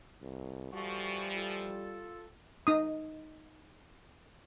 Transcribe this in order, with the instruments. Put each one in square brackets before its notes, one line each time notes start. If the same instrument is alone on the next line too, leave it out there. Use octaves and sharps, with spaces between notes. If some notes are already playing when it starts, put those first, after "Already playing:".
[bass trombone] C2
[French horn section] E3 F3 [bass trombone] G3 [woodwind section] F#4 A4 C#6
[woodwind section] F4 A4
[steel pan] D#4 D#6